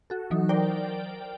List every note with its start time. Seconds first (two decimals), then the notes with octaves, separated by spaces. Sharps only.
0.10 F#4 A4
0.31 E3 F#3 D#4
0.49 A#4 C5 D5 G5